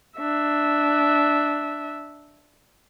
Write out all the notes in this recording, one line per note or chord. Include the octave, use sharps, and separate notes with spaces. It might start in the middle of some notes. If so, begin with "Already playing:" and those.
D4 E5